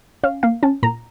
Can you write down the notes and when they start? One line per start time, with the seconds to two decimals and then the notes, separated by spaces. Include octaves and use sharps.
0.23 C#4 F5
0.43 A#3 F5
0.63 C#4 A5
0.83 A#2 A#5